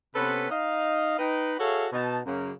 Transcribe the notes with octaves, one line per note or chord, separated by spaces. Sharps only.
C3 B3 C#4 A4 B4
D#4 D#5 F5
D#4 B4 G5
F#4 G#4 A4 C#5 E5 F5
B2 D#4 A5
F#2 C#3 A#3